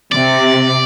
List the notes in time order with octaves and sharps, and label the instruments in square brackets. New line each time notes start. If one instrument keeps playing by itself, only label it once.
[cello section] C3 [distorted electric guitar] D5